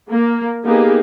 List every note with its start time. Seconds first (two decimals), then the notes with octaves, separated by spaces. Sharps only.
0.10 A#3
0.65 A#3 B3 D#4 G4 G#4